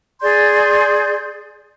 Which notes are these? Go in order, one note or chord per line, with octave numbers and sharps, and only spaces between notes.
G#4 D5 C6 G6